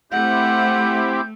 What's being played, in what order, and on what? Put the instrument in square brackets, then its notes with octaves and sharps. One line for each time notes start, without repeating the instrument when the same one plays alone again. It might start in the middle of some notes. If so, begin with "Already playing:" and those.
[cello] A3 [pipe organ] C4 E4 G4 [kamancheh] F#5 [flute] G6